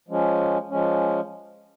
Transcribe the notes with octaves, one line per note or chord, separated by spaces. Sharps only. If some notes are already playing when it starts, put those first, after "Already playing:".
F3 G#3 C#4
F3 G#3 C#4